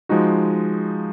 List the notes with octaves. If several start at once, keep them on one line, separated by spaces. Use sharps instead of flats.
F3 G#3 D#4 F#4